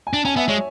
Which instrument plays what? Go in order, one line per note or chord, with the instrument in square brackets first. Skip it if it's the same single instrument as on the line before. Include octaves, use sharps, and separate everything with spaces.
[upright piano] G#5
[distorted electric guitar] D4 [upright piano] A5
[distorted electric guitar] C#4 [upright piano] G#5
[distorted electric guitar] B3 [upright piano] E5
[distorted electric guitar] G#3 [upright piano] C#5